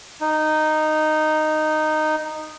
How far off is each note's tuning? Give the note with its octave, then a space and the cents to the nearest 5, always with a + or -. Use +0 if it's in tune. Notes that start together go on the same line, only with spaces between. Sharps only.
D#4 -10